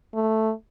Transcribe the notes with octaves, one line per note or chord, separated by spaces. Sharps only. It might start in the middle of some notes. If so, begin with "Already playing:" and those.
A3